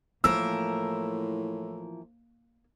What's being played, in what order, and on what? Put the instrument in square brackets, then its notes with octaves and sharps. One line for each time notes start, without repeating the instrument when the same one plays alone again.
[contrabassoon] A2 [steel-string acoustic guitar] E3 F3 A#4 [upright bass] A#3 [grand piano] E6